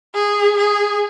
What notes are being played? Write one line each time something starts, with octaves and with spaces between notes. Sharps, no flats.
G#4
G#4